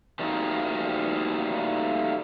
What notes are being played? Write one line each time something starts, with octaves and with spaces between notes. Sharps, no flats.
D#3 G3 A3 A#3 D#4 F#4